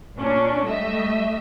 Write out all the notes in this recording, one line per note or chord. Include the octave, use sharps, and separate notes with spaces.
A#2 C#4 D4
G3 A3 D#5 E5